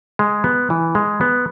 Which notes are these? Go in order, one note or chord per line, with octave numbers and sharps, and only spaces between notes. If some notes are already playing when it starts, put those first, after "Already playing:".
G#3
B3
E3
G#3
B3